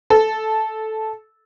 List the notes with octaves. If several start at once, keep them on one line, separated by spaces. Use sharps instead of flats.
A4